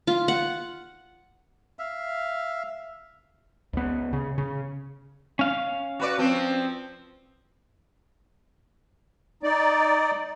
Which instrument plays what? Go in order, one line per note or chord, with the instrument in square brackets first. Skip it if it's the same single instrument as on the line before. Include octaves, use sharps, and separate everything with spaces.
[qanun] F4
F#5
[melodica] E5 F5
[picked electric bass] C#2 B3
C#3
C#3
[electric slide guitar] C#4 F5
[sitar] F#4 B4 D5
F3 C4
[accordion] D#4 D5